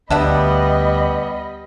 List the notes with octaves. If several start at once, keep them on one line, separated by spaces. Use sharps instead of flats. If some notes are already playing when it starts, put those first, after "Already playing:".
D2 G3 B3 D4 D#5 E5 F#5 B5